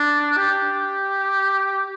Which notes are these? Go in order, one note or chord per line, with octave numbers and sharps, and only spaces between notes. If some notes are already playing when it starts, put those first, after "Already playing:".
Already playing: D4
G4